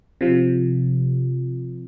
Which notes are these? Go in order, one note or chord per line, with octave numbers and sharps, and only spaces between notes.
C3 F3